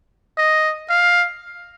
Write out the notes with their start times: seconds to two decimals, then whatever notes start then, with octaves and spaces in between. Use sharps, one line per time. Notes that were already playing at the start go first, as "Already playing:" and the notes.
0.37 D#5
0.89 F5